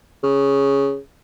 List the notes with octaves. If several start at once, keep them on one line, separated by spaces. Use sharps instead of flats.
C#3